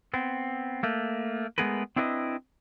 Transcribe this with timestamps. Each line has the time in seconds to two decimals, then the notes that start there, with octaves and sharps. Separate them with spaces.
0.14 B3 C4
0.83 A3 A#3
1.58 G#3 A3 B3 G#4 A#4 B4
1.96 C4 D4 E4 B4 D5 D#5